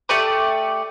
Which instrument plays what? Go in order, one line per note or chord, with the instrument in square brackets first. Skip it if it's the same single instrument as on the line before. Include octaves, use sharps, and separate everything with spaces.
[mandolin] A3 G4 D5 D#6